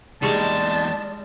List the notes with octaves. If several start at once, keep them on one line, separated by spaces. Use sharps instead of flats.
E2 G3 G#3 D#4 D5 A5 C#6